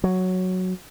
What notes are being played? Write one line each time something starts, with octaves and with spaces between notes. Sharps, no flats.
F#3